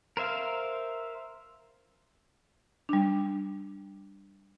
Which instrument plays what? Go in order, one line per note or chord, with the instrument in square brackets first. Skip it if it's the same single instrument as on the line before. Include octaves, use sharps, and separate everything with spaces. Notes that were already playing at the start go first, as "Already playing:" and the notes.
[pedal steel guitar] A#4 C5 E5 F5
[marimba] G3 D4